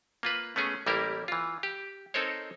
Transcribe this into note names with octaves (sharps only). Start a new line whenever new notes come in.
A#3 F4 B4
A3 B3 C#4 G#4
A1 G3 A#3 E4 G4 A#4
E3 F4
G4
C4 D#4 A4 A#4 C5 C#5